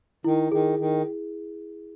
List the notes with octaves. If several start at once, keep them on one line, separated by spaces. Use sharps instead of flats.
D#3 E4
D#3 G#4
D#3